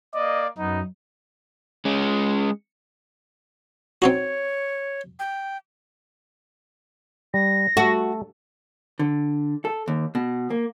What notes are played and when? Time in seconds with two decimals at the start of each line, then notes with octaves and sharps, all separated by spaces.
0.14 A#3 D5 D#5
0.58 F#2 B3 D#4
1.85 G#3 C#4
4.02 C4 D#4 F#4 C#5
5.19 G5
7.34 G3 A#6
7.77 A3 F#4 A4
8.99 D3
9.65 A4
9.88 D#2
10.15 B2
10.50 A#3